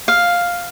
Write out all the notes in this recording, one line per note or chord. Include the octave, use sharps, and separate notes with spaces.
F5